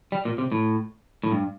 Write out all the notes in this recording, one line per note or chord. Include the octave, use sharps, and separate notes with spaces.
G3
A#2
C3
A2
A2
G2